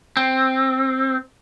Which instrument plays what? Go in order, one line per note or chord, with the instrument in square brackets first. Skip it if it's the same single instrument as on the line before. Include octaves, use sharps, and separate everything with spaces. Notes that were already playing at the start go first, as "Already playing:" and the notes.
[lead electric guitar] C4